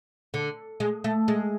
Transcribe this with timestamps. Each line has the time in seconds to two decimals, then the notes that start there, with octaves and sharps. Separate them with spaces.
0.34 D3
0.80 G#3
1.04 A3
1.28 G#3